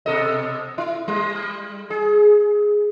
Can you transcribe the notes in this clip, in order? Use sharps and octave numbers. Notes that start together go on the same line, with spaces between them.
B2 A4 D#5
E4
G3
G#4